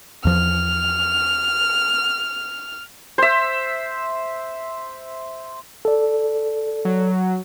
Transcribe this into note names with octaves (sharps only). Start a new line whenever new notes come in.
E2 F3 F6
C5 E5
A4 D5
F#3